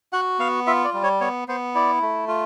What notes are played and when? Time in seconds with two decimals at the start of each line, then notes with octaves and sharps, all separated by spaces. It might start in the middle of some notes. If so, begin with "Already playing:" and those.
0.13 F#4 F#5
0.39 B3 F5
0.67 F4 E5
0.84 D5
0.94 G3
1.03 C#5
1.21 B3 C#5
1.48 B3 C5
1.75 E4 D5
2.02 A3
2.28 F4